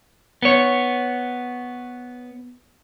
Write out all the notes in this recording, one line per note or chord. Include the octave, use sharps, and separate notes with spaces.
B3 C#5